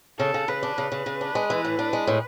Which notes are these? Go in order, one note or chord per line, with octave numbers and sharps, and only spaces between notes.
C#3 A4
C#3
C#3 B4
D4
C#3 B4
C#3
C#3
D4
G#3
E3
A2
D4
G#3
A2